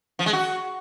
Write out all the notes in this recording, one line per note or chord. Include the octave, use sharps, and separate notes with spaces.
F3
G#3
F#4